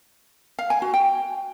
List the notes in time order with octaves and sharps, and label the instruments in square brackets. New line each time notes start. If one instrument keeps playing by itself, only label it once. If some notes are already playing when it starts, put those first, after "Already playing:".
[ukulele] F5
G#5
F#4
G5